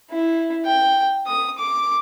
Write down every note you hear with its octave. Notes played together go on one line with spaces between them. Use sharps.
E4
G5
D#6
D6